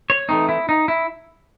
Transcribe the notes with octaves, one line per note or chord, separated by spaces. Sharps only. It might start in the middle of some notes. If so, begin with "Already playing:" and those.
C#5
E3 A3 C4 D#4
E4
D#4
E4